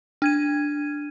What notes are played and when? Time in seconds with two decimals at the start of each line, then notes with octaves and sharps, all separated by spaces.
0.22 D4 G#6 D#7